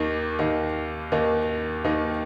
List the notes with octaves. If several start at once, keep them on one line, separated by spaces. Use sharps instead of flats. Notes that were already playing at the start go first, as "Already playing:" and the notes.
Already playing: D#2 D#3 A#3 D#4
D#2 D#3 A#3 D#4
D#2 D#3 A#3 D#4
D#2 D#3 A#3 D#4